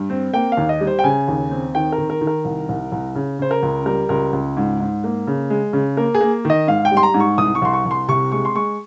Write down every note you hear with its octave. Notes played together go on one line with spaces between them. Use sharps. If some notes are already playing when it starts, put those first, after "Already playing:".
Already playing: G2
C4
A#3 G5
F5
D#2
D#5
G3
C5
G5
C#3 G#5
D#2
C4
D#3 G5
A#4
D#3
A#4
D#3
A#4
C2
C2
C2
C#3
C#3 C5
A#4
C#2
G3 A#4
C#2 A#4
C#2
G#2
G#2
A#3
C#3
G#3
C#3
A#3 A#4
G#4
A#3
D#3 D#5
G#2 F5
G5
G3
C6
A#5
G#2
C#6
C2 D#6
C#6
C2 C6
C#6
C2
C6
C3 C#6
G#3 C#6
C6
G#3 C#6